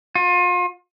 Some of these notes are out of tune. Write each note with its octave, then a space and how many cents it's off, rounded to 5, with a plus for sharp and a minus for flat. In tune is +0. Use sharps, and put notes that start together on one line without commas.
F4 +35